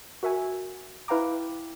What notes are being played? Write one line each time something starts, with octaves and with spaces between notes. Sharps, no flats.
F#4 A#4 E5 F#5 G#5
E4 B4 F5 G5 A#5 D6